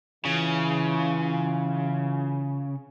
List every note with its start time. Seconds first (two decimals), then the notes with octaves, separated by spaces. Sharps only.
0.25 C#3 E3 F4